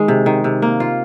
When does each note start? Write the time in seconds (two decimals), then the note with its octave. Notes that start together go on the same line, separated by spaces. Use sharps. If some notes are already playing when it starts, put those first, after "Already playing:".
Already playing: D#3 G#3
0.08 C3
0.26 D#3
0.44 C3
0.62 A#3
0.80 F4